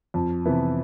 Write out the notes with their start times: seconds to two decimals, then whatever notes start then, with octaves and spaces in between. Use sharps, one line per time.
0.14 F2
0.46 C3 E3 B3 E4